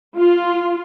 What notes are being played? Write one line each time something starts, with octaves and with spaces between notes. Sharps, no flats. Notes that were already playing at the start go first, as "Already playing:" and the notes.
F4